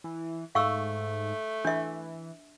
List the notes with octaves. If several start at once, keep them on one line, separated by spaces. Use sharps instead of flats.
E3
G#2 A3 F5 C#6 E6
E3 D4 E5